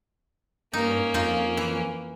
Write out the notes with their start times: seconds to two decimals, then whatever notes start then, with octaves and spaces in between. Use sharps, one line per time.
0.73 G2 A#3 C#4 D#4
1.14 F2 D#4 F4
1.57 E3